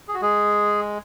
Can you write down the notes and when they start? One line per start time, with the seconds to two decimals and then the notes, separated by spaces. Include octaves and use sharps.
0.08 G#4
0.14 F#4
0.22 G#3 G#4